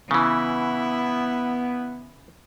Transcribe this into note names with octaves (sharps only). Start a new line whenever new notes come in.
C#3 E3 B3 E4